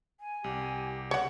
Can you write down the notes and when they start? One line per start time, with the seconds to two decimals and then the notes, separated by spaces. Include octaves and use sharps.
0.20 G#5
0.44 C2 G4
1.11 C#3 C#5 F#5